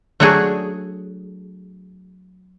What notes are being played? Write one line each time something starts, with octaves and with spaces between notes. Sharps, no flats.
F#3 A3 D4 F#4 G#4